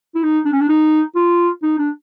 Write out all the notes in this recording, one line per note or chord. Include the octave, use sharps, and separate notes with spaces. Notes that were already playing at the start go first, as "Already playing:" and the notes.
E4
D#4
D4
C#4
D4
D#4
F4
D#4
D4